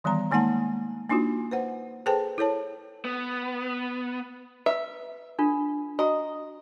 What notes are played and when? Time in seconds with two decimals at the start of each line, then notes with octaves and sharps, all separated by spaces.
0.04 D#3 E3 G3 B3 A#5
0.31 D#3 G#3 A#3 D#4 F#5 A5
1.09 A#3 D4 D#4 F4 F#4
1.51 B4 C5 F#5
2.06 G#4 A4 B4 C5 G5 A5
2.38 E4 A4 C#5 A5
3.05 B3
4.66 B4 E5
5.39 D4 F4 A4
5.99 F#4 D#5 A#5